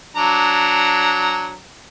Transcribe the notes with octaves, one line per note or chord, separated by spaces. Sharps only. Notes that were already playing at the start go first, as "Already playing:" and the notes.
F#3 D4 A#5